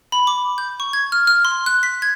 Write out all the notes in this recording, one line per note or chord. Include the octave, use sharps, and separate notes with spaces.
B5
D6
G6
C#6
G#6
F6
F6
C6
F#6
B6
G#6